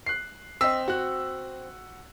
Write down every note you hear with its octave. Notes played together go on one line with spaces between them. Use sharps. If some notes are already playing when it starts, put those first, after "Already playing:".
F#6 C7
C4 D#5 E6 B6
F#4 F#6